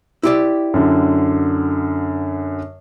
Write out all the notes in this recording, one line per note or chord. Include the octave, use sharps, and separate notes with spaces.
E4 G4 D5
F#2 D3